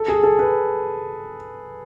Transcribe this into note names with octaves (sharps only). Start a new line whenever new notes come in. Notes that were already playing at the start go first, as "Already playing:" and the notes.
Already playing: A4
G#4
A4
B4